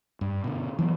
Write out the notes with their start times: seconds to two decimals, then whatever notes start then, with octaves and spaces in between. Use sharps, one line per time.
0.21 G2
0.44 B2 D3
0.79 E3 F#3 G#3 B3